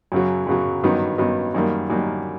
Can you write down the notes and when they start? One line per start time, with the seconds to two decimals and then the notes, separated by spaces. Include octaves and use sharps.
0.12 F#2 C#3 F#3
0.47 F#2 C#3 F#3
0.83 G2 D#3 F#3 B3 D#4
1.18 G2 D#3 F#3 B3 D#4
1.54 F#2 D#3 G3 A#3
1.90 F#2 D#3 G3 A#3